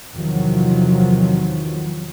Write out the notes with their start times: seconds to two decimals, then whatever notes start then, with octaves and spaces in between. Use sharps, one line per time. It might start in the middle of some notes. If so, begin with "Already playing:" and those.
0.13 E2 C3 D#3 F3 F#3